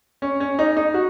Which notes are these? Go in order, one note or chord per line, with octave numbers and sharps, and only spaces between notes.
C#4
C#4
D#4
D#4
F#4